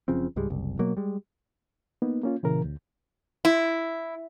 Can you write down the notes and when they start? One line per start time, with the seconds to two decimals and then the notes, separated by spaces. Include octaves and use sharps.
0.08 F#1 C#3 F3 C4
0.36 C#2 G#2 G3 G#3
0.50 F#1 C2
0.79 B2 F#3 A#3
0.97 G3 G#3
2.02 A#3 B3 D#4
2.23 A#3 C#4 F4
2.43 A#2 C#3 E3 A#4
2.64 D2
3.45 E4